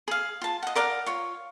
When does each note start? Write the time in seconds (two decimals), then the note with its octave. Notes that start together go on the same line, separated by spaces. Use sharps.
0.08 G#4 F5
0.41 F4 A5
0.63 D#5 F#5
0.75 A#4 D5 F5 F#5
1.06 F4 C#5